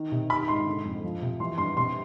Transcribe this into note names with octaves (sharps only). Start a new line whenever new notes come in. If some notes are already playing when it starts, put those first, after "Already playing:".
Already playing: D#3
C3
D#3 B5
G#2 C6
D3
F2
F3
C3
E3 C6
G2 C6
C3 C6